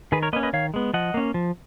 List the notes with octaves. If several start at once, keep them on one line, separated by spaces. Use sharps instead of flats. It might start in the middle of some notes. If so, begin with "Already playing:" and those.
D#3 G#4 B4
A#4 C#5
A#3 C#4 B4 D#5
B4 D#5
D#3 C#5 F5
G#3 B3
F3 D#5 F#5
A#3 C#4
F3